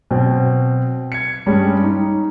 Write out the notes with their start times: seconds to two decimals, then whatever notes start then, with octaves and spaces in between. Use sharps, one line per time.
0.11 B2 F#3 C4
1.12 G#6 C#7
1.46 G2 G3 G#3 C#4
1.84 D#4